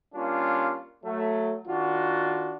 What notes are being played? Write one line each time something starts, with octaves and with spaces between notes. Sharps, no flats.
G3 A#3 C#4 D4 F4
F#3 A3
D#3 D4 F4 F#4